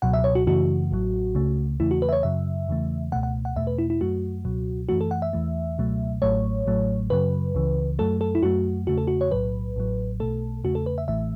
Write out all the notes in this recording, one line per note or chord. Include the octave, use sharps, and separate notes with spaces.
C#2 B2 F#3 F#5
E5
C#5
F#4
F#2 C#3 E3 A3 F#4
A1 A2 F#3
C#2 C#3 A3
E2 C#3 E3 A3 E4
F#4
B4
E5
C#5
F#2 C#3 F#3 E5
E2 C#3 E3 A3
C#2 B2 A3 F#5
F#5
F#5
E2 B2 A3 E5
B4
E4
E4
F#2 F#3 A3 F#4
C#2 B2 F#3
F#2 E3 A3 F#4
A4
F#5
E5
E2 E3 A3
C#2 B2 F#3 A3
A1 A2 F#3 A3 C#5
A1 A2 F#3 A3
F#2 C#3 F#3 B4
C#2 C#3 E3
F#2 F#3 A3 A4
A4
E4
F#2 F#3 A3 F#4
E2 C#3 A3 F#4
A4
F#4
C#5
B1 A2 F#3 B4
A1 A2 F#3
B1 B2 A3 A4
E2 C#3 A3 F#4
A4
B4
E5
A1 A2 E3 A3 E5